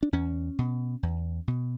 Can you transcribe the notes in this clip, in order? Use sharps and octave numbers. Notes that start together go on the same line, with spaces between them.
D4
E2 C#4
B2
E2
B2